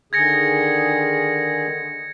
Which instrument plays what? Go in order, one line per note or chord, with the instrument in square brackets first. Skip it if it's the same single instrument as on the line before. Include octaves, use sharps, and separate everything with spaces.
[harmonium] D3 D#3 G#4 [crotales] G#6 A#6 C#7